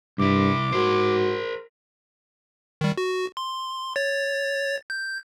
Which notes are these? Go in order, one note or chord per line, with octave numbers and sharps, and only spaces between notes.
C2 G2 E4 D6
G#2 F#4 A#4 C5
D#3 G3
F#4
C6
C#5 A6
G6